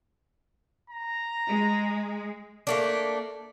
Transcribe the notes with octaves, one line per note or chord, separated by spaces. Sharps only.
A#5
G#3
A3 A#3 D4